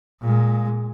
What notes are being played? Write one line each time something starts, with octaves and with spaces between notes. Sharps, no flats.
A#2 G#3